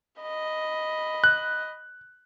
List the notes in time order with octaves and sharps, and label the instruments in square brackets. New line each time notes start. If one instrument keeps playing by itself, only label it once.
[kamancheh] D#5 B5
[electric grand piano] F#6